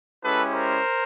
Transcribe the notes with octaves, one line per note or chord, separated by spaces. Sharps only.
G#3 C#4 E4 G4 A4 B4
A#4 C5